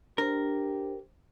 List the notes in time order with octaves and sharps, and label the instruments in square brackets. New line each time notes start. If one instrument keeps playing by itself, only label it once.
[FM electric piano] D4 C5 [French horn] G4 [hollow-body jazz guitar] A#4